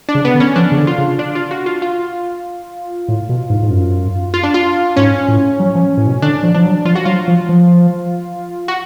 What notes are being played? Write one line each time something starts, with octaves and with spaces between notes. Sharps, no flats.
D4
C#3
B3
D3
C#4
F3 D4
C#3
D3
F4
C#3
D4
F4
F#4
F4
F4
A2
B2
G#2
G#2
F#2
F4
D4
F4
G#2 C#4
A2
F#3
F3
A2
B2
D3 D4
F3
F3 D4
F#3
F3 F4
F#4
F#3 F4
F3
F3
F#4